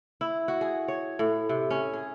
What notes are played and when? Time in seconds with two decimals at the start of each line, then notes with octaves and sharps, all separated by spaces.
0.21 E4
0.48 F#4
0.61 G#4
0.88 C#5
1.19 A2
1.49 C3
1.71 C#4
1.93 G#4